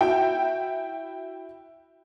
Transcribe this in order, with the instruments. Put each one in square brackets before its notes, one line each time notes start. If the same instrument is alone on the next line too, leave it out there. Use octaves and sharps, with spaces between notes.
[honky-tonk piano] E4 F#4 G5